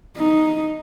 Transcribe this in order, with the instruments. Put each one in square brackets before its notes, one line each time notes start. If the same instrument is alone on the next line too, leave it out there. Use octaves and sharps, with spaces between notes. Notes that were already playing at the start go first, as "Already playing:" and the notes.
[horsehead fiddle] D#4